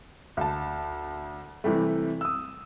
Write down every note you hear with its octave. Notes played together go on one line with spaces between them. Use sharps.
D2 A5
C3 E3 G3 A3
D#6 E6